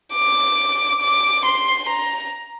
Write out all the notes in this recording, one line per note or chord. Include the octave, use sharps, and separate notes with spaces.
D6
D6
C6
A#5